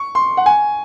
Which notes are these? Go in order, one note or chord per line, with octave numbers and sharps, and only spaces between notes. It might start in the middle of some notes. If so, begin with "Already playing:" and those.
Already playing: C#6
C6
F#5
G#5